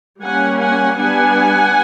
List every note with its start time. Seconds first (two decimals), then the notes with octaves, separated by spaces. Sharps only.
0.22 G3 A#3 C#4 F#5 G#5
0.60 F#5 G#5
0.99 G3 B3 D4 F#5 G#5